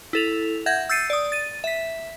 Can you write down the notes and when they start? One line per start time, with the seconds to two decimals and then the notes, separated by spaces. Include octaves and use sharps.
0.13 E4 A4 F7
0.66 E5 F#5 G6 G#6 A#6
0.89 E6 G6 A6 C7 C#7 D#7
1.10 D5 D#6
1.32 A6 D#7
1.64 E5 B6